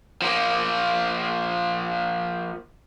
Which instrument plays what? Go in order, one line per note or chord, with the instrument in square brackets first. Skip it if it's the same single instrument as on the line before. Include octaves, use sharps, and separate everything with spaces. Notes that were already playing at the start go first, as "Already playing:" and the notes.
[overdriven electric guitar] F3 A#3